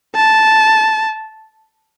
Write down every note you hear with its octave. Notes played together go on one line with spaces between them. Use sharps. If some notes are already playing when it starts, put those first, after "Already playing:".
A5